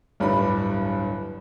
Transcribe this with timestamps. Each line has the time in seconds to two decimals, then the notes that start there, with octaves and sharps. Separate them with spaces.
0.20 D1 G1 G2 G3 D4 B5